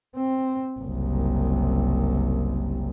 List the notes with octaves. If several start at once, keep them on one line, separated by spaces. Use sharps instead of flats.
C4
F#1 C2